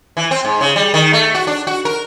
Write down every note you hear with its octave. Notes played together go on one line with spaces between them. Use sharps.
E3
C4
G#2
C#3
G3
D#3
A3
F#4
D4
F#4
A#4